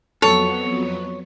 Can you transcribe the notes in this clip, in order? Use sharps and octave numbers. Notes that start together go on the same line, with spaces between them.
F2 F#3 B3 A4 C#5